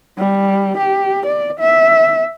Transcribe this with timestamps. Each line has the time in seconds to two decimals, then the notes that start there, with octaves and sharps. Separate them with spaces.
0.18 G3
0.78 G4
1.26 D5
1.60 E5